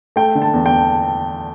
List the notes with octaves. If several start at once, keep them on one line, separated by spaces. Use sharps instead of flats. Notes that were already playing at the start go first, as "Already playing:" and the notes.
A3 G5
D3
A5
E2
G5